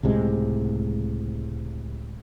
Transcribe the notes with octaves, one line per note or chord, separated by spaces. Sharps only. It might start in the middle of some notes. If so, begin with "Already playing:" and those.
C#2 A2 C3 G#3